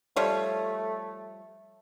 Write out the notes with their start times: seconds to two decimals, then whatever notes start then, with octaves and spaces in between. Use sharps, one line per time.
0.16 F3 G3 A3 C#5